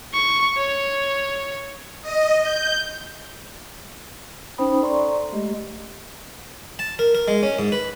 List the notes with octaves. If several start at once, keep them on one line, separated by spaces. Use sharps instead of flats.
C#6
C#5
D#5
G6
C#4 D#4 C5 G5 B5 D#6
A4 C5 D5 A#5 C6 C#6
G#3 A3 G4 D#5
A5
A#4
A#4
G#3
C#4
G#2
B4